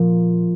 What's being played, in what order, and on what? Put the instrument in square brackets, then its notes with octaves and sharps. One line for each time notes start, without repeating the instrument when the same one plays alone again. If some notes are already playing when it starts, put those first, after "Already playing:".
Already playing: [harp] A#2 F3